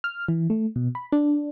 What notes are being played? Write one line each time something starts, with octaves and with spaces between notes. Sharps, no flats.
F6
E3
A3
B2
B5
D4